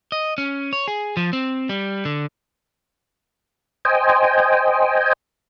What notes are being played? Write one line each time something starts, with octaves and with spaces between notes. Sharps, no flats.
D#5
C#4
C#5
G#4
F3
C4
G3
D3
C5 D#5 G5 G#5